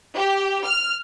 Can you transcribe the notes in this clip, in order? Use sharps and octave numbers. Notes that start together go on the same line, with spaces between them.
G4
F6